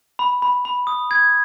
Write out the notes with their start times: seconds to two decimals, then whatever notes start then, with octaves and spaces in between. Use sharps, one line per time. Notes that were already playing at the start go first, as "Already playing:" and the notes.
0.19 B5
0.42 B5
0.65 B5
0.87 D#6
1.11 G#6